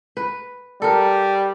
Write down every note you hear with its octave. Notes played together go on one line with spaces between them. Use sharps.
B4
G3 A4 A#4